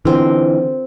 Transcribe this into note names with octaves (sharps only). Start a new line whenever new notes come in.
D3 E3 C4 F4 A#4